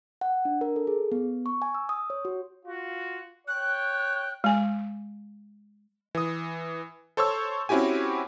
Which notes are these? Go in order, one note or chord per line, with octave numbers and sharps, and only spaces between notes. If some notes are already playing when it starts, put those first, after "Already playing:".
F#5
D4
A#4
A4
G#4
B3
C#6
G#5
E6
D#6
C#5
F#4
F4 F#4
C#5 G5 F#6
G#3 G#5
E3 D#6
A4 C5 C#5 C#6 E6
C4 C#4 E4 F#4 G4 G#5